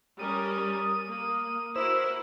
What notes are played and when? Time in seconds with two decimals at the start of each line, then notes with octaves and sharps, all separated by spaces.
0.19 G3 C#4 A#4 D#6
1.06 A#3
1.76 E4 F#4 A#4 C5 E6